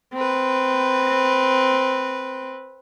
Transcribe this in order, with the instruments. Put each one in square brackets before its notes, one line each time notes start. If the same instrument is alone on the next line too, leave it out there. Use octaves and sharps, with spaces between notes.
[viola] C4 B4